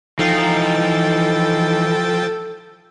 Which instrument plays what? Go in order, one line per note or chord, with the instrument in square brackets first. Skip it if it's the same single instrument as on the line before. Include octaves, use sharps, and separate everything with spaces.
[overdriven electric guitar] E3 F5 [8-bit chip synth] F3 G5 A6 [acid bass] D#4 [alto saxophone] A4